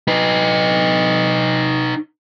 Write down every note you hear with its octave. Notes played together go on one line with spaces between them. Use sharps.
D#4 B4